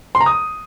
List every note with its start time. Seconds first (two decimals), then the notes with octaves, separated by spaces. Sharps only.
0.15 C6
0.20 A#5
0.26 D#6